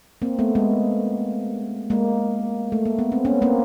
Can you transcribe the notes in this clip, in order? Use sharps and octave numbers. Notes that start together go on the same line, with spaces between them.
A#3 C4
A3 B3
G#3 A#3
G#3 A#3
A3
A#3
B3
C4
B3 C#4
A#3 C4